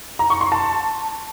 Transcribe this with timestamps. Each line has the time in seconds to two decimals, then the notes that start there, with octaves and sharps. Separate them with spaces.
0.19 A#5
0.30 C#6
0.41 C6
0.52 A5